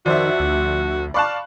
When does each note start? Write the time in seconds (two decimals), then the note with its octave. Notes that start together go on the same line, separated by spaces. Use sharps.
0.06 F2 D#3 F#4 C5 D5 E5
0.40 D2
1.14 D5 F5 A5 B5 C#6 F#6